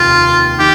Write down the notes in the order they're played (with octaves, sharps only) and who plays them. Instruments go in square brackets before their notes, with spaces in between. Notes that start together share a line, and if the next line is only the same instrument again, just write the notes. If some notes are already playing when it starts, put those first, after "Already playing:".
Already playing: [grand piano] F1 D#2 [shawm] F4
[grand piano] D#3 [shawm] G4